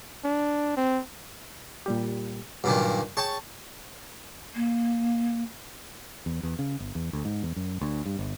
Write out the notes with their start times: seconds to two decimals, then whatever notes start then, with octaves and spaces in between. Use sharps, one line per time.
0.24 D4
0.77 C4
1.86 A#2 G3 G4
2.64 G2 A#2 D#3 F#3
3.17 G#4 C#5 G5 A5 C#6
4.55 A#3
6.26 E2
6.43 E2
6.59 C#3
6.80 G1
6.95 E2
7.13 D2
7.25 G#2
7.43 E2
7.56 F#2
7.81 D2
8.06 G2
8.19 G1